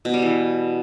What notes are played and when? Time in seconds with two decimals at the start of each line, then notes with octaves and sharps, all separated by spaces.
0.05 B2
0.14 G3
0.22 E3